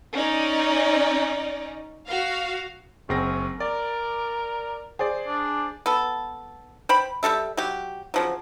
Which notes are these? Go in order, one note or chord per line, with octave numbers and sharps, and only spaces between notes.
C#4 D#4 D5
F#4 F5
F#1 C4 C#4 A#6
A#4 D5
G#4 C5 D5
D4
B3 A4
C5 G5 B5
G3 F#4 A4 E5
F#3 G4
C#3 F3 F#3